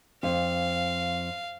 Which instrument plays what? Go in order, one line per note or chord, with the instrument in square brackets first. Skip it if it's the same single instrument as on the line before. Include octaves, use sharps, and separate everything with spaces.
[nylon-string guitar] F2 [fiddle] F5